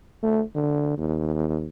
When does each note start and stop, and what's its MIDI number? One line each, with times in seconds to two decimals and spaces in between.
0.23 0.43 57
0.56 0.96 50
0.98 1.67 39